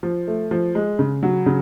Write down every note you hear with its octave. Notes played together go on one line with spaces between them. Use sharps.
F3
A3
F3
G#3
C#3
F#3
C#3